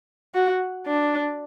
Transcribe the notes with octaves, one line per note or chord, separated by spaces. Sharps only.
F#4
D4